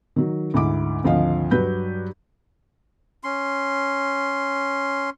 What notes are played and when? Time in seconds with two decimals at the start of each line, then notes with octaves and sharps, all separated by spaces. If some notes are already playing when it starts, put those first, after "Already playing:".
0.16 D#3 F#3
0.54 D2 G#2 E4 D6
1.04 G#1 D2 F3 D#5 F5
1.51 G2 F#3 B4 G6
3.24 C#4 C6